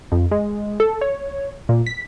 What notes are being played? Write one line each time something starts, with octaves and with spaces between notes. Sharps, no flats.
F2
G#3
A4
C#5
A#2
B6